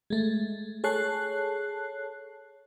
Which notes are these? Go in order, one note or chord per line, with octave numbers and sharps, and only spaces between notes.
G#3 A3
G#4 A4 C#5 A5 F#6 C7